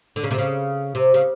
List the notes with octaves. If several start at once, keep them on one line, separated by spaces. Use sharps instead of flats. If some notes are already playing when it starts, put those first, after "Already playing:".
D3
C#3
C3
C#3
C3
C#3